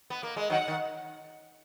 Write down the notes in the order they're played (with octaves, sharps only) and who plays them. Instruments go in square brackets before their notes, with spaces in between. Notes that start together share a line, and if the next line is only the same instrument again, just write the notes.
[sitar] B3
A#3
G#3
[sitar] D#3 F#3 [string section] F#5
[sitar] D#3